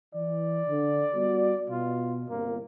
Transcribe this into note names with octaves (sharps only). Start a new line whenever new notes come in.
E3 D5
D3
G3 B3 F#4
B2 F4
G1 C2 A#3